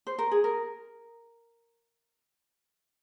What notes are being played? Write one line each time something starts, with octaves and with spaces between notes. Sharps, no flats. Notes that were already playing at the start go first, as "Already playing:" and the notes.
C5
A#4
G#4
A#4